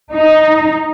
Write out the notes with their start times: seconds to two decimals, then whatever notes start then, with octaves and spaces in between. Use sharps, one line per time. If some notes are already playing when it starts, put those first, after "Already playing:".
0.12 D#4